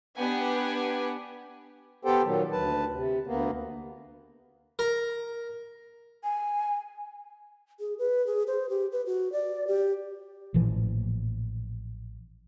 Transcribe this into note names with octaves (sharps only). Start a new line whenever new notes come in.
B3 D4 G4 B4 F#5 G#5
B3 G4 A4 C5 G5
A#2 D#3 F#3
D2 B4 A5
C3
D2 A#3 B3
A#4 A#5
G#5
G#4
B4
G#4
C5
G4
B4
F#4
D5
G4
A1 A#2 E3 F3